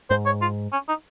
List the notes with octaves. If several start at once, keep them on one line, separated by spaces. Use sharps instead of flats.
G#2 C5
C#5
F4
C#4
D#4